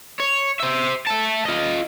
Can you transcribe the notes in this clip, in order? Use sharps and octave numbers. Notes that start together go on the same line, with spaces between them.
C#5
C5 E5
E5 A5
F4 D#5